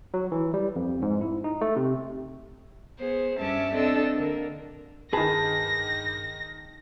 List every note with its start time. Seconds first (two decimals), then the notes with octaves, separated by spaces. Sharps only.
0.14 F#3
0.32 E3
0.54 G3
0.76 F2
1.02 G#2
1.21 E4
1.44 D#4
1.61 A3
1.76 C3
3.00 B3 G#4 C5
3.38 G2 C#4 E5 A5 D6
3.73 C4 D4 A4 D#5 E6
4.15 D3 A#3
5.13 G2 D#3 G#4 B4 A5 A#6